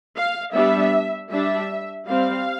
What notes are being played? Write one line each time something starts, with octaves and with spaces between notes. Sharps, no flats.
F5
G3 B3 D4 E5
G3 D4 E5
G3 C4 F5